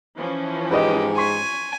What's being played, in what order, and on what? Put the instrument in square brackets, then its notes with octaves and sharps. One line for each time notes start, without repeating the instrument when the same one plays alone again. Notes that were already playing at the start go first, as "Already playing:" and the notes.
[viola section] E3 F3 C#4
[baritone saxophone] G#2 [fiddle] G4 [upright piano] B4 D#5
[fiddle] G#5 [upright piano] C6 C#6 B6